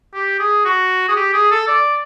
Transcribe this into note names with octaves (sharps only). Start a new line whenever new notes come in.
G4
G#4
F#4
G#4
G4
G#4
A4
D5